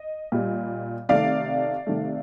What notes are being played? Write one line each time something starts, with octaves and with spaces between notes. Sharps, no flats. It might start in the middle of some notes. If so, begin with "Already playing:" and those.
Already playing: D#5
A#2 G3
C3 D#3 A3 D5 F5
C3 D#3 A3